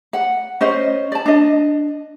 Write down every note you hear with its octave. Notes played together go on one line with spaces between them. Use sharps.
F#5
C#4 C5 D#5
D5 A5
D4 D#5